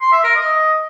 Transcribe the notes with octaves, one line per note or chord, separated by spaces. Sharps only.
C6
E5
A#4
D#5